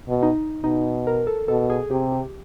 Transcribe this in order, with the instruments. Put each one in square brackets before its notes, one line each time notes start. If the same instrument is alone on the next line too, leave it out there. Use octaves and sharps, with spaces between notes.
[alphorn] B2
[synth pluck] D#4
[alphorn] B2 [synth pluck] D#4
[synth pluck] A#4
A4
[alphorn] B2 [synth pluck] A4
[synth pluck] G#4
[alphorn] C3 [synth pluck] G4
[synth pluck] G4